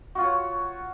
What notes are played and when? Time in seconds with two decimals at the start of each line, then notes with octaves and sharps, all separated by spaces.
0.15 F#4
0.18 F4
0.20 F#5
0.23 C#5